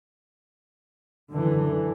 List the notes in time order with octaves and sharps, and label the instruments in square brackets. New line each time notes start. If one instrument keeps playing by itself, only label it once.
[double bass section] F#2 D3 E3